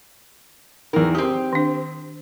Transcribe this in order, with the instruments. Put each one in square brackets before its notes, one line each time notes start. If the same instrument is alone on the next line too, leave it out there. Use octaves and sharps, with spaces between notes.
[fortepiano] E2 D#3 [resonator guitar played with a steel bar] A#4
[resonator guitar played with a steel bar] C4 G4 [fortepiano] D#6
[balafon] D#3 D4